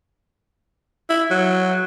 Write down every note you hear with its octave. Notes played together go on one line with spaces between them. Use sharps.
E4
F#3